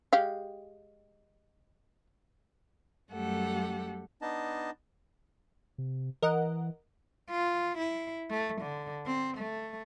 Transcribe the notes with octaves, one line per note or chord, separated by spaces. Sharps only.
G#3 G4 F5
F#2 G3 A3 G4 A4 F#5
B3 D4 D#4 D#5 A5
C3
E3 A#4 D#5 F#5
F4
E4
A3
D3
C4
A3